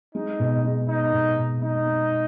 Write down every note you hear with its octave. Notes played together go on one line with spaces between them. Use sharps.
G#3 D#4
B2
G#3
B3 D#4
B2
B2
G#3 D#4
G#3
B3